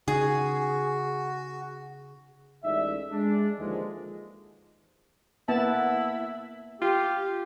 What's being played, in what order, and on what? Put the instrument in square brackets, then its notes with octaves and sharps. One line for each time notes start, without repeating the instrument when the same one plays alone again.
[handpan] C#3 D#4 [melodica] F#4 [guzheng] G#4
[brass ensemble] A1 G#3 D#4 D5 E5
G#3 D4
D#2 D3 E3 F3 G#3
[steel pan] A#3 B3 A5 [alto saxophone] E4
[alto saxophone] F4 [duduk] G4